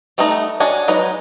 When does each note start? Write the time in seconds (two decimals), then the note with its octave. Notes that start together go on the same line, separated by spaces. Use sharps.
0.18 G3 A3 B3 D#4
0.60 D4 F#4 C#5 D#5 G#5
0.88 F#3 G#3 B3 D#4 B4